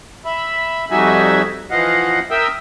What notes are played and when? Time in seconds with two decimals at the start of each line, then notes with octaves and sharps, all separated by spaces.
0.25 E5 B5
0.91 F2 G3 D#4 F#4 E5 G#5
1.71 E3 F3 D#5 F5 F#5
2.31 A#4 E5 G5 D#6 E6